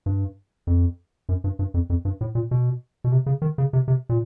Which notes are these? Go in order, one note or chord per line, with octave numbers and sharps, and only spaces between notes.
G2
F2
F#2
G2
G2
F2
F2
G2
A2
A#2
B2
B2
C3
C#3
D#3
C#3
C3
C3
A#2